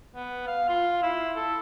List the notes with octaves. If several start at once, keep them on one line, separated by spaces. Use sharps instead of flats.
B3
F5
F4
E4
A4